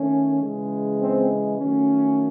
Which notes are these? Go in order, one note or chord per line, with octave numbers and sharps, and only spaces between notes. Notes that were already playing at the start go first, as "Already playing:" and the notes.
Already playing: D#3 A3 C#4
C#3 E3 G#3
C4
D#3 F#3 A3 C#4